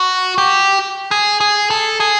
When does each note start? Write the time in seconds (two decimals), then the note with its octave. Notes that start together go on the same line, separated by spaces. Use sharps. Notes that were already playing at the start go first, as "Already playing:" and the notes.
Already playing: F#4
0.38 G4
1.11 G#4
1.41 G#4
1.70 A4
2.00 G#4